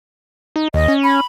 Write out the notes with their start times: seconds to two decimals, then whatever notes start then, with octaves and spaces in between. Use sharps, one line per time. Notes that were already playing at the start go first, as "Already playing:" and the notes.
0.56 D#4
0.74 D#2 D#5
0.88 C#4
1.03 B5